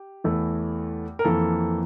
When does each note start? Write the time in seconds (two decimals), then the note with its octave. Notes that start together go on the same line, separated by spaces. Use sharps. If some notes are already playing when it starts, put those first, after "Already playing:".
Already playing: G4
0.24 E2 E3 A3
1.19 A#4
1.25 F2 E3 A#3 A4